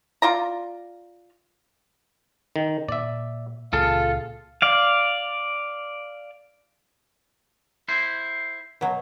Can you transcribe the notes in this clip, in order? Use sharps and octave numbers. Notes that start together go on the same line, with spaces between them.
F4 D5 A#5
D#3
A#2 D5 E5
C#2 A#2 F4 G#4 A4 F5
D5 F5
E4 C5
B2 F#3